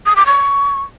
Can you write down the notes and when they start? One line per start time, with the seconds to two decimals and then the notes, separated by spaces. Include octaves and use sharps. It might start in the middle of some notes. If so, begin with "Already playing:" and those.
0.06 D#6
0.16 D6
0.26 C#6